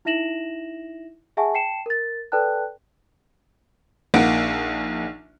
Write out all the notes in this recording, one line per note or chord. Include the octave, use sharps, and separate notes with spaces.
D#4 E4 E5 A#6 E7 F#7
G#4 E5 F#5 G#5 A5 C#6
G5 A5 C7 C#7 E7
A#4 A6
A4 B4 D5 G5 A5 F#6
A#1 A#3 D#4 F#5 D7